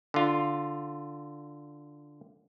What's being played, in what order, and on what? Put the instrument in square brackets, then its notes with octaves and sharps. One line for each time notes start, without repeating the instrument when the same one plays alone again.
[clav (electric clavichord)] D3 F4